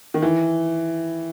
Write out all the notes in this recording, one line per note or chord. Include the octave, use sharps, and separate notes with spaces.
D#3
E3